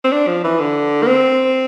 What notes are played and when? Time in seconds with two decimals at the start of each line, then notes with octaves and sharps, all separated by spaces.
0.04 C4
0.12 D4
0.28 F3
0.44 E3
0.59 D3
1.03 A#3
1.07 C4